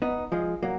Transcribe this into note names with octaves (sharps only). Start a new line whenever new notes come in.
B3 D#4
F3 G#3
F#3 A#3